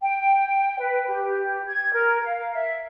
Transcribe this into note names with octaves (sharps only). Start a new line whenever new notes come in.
G5
B4
G4
G#6
A#4
F5
E5